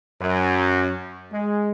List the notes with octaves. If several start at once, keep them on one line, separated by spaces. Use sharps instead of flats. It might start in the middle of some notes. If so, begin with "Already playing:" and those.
F#2
G#3